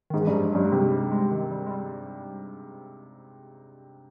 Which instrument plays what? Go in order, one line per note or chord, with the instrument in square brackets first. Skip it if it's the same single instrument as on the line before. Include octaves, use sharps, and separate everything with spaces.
[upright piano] G#2 [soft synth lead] D#3
[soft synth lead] E3
[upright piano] G2
[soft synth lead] F3
[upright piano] G2 [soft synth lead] F#3
[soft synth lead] G#3
[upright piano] C3 [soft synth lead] G3
[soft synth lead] G3
G#3
D#3
G3
G#3
G3